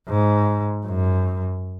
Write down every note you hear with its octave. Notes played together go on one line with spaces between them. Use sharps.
G#2
F#2